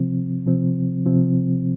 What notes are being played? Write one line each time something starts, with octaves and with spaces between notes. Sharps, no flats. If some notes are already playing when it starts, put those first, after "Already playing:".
Already playing: C3 F3 C4
C3 F3 C4
C3 F3 C4